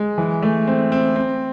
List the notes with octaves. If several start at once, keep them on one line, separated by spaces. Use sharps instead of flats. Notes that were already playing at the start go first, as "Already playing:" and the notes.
Already playing: G#3
E3
A3
C4
C4
C4